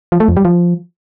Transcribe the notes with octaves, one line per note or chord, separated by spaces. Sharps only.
F3
A3
F2
G3
F3